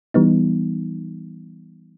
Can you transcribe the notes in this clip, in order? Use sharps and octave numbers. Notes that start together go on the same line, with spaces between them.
E3 G3 B3 D#4